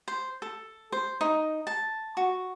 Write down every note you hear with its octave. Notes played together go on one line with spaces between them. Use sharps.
C5
A4
C5
D#4
A5
F#4